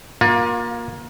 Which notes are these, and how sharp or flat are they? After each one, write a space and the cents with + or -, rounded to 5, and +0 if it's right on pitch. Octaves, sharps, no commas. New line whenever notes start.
A#3 +20 F4 +35